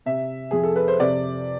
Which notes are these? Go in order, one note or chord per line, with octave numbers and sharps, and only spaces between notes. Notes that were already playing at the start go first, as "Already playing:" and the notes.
C3 E5
F2 G#4
A4
B4
C5
C3 D5